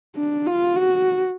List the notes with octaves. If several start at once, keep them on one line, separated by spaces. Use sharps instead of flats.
D4
F4
F#4